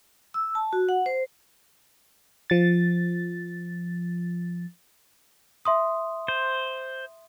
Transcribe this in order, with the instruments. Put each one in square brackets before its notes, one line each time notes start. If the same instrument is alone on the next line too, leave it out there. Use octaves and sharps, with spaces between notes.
[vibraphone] E6
A5
F#4
F#5
C5
[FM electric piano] F3 A6
[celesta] E5 C6 D#6
[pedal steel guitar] C5